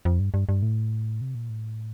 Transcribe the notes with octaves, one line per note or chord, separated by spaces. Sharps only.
F2
G2
G2
G2
A2
C3
A#2
A2